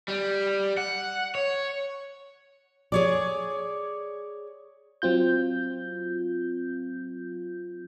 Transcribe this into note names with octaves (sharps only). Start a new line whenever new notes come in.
G3
F#5
C#5
G#4 C#5 D5
F#3 C4 F4 G6